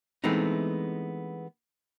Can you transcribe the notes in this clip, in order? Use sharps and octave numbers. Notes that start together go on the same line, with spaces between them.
E3 G#3 A3 B3 C4 D#4